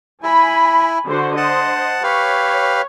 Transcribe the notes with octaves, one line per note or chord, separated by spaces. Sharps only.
E4 G#5 B5
D3 F#4 C5
C5 D#5 F#5 A5
G4 B4 C#5 F5